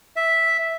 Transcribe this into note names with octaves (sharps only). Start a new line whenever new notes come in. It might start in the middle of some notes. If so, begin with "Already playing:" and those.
E5